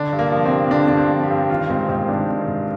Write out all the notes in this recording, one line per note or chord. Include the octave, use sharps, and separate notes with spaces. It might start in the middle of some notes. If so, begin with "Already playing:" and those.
Already playing: D3 D4
G2
A#3
F3
C4
G2
D3 D4
G2 D4
C4
F3
G4
G2
D#3 F4
G#2 C4
A#3
G#2 C4
D#3 D4
D#3
G#2